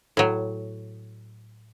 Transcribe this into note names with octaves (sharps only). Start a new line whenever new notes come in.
A2 F#3